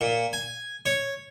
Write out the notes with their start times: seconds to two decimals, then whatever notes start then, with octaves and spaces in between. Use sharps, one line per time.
0.01 A#2
0.33 G#5
0.86 C#5